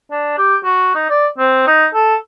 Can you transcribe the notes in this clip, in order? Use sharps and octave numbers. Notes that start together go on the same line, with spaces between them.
D4
G4
F#4
D#4
D5
C4
D#4
A4